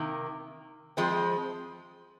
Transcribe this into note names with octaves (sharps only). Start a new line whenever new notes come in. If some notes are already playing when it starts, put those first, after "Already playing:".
Already playing: C3 D#3 A#3
F2 F3 G#3 C4